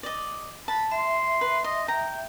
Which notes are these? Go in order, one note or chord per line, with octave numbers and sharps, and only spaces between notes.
D5 D#5
A5 B5
E5 C6
B4
D#5 C6
G5 A#5